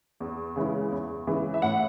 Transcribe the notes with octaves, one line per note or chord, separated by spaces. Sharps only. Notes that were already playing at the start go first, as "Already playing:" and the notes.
E2
C#3 E3 G#3
E2
C#3 E3 G#3
E5
A2 F#5